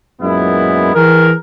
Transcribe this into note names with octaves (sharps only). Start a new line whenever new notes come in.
F#2 A#2 G#3 B3 E4
E3 G#4 A#4